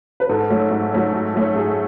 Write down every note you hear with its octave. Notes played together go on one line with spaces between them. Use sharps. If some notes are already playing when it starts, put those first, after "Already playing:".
B4
G#2 A4
F#3 A3 C#4
G#2
F#3 A3 C#4
G#2
F#3 A3 C#4
G#2 G#4